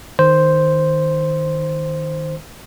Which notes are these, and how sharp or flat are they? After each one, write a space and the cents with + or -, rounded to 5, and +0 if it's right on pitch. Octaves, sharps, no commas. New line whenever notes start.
D#3 +0 C5 +0